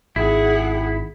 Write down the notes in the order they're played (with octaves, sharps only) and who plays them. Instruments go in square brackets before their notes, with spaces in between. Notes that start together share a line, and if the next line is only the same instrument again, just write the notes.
[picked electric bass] G#1 [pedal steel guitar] E4 [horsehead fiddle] G#4 F#5